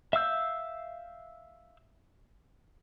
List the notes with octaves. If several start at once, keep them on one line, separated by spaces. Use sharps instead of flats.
E5 F5 E6 G6